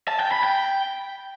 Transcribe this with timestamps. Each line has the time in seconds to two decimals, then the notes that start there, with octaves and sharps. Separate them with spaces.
0.08 A5
0.20 G5
0.32 B5
0.43 G5